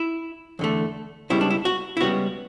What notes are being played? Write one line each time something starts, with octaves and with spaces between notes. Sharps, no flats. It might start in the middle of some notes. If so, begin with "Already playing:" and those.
Already playing: E4
E2 D3 A3
C#2 C#3 G3 B3 E4
D4
E4
F#4
E4
C#2 C#3 G3 B3 F#4